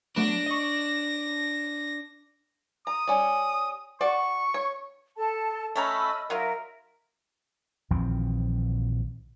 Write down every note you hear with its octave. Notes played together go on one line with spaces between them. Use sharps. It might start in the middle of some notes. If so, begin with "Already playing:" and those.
F#3 A3 B3 D4 A#6
D#5 C#6
A#5 D#6
G3 C#4
F#4 D5 C#6
C#5
A4 A5
A3 C#4 D#5 A#5 B5 E6
F#3 D#4 F4 A#4 E5
A#1 D#3 E3 C4